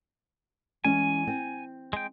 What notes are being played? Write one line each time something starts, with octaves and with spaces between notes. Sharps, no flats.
E3 G#3 C#4 G#5
C4
G#3 G5